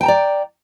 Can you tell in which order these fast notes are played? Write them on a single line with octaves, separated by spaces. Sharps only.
G5 A5 A#5 D5